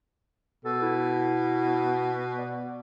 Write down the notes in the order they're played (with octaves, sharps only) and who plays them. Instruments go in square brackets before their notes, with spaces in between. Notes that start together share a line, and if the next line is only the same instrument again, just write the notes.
[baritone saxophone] B2 [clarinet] A4
[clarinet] E4
D5